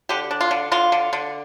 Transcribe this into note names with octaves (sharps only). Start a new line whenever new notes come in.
D3 G4
D4
F4
D3
D3 F4
D3
D3